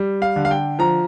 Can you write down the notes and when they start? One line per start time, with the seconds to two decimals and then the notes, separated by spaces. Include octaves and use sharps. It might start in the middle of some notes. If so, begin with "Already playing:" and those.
Already playing: G3
0.22 F5
0.36 D3
0.45 F5
0.51 G5
0.79 F3 A#5